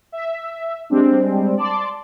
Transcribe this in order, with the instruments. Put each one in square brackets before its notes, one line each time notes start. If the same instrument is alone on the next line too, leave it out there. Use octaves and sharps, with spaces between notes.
[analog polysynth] E5
G3 G#3 C4 D4
D5 A5 C6